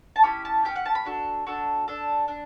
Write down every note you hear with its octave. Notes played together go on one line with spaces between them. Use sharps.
A5
C#4 E4 G4 B5
A5
C#4 E4 G4 G5
F#5
A5
B5
D4 F#4 A4
D4 F#4 A4
D4 A4
D4